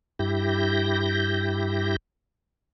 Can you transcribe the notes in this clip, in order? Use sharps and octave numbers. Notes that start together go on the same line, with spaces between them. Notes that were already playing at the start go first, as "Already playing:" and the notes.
G2 E4 G4 G6 A#6